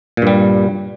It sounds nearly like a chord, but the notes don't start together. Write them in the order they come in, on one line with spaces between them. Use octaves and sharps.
A#2 G2 G3